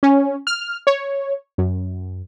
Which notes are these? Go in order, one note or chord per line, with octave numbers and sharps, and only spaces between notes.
C#4
F6
C#5
F#2